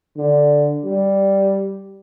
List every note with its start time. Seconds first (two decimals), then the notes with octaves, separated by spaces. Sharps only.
0.17 D3
0.84 G3